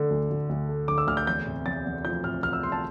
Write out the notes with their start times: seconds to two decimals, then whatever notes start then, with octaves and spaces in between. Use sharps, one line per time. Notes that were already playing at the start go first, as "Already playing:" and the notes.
Already playing: D3 A3
0.10 D2
0.30 D2
0.49 D2
0.69 A3
0.88 D3 D6
0.98 E6
1.07 D2 F6
1.17 G6
1.27 E2 G6
1.46 C3
1.66 E2 A6
1.85 E2
2.05 F3 G6
2.24 C3 F6
2.43 C3 F6
2.53 E6
2.63 E2 C6
2.72 A5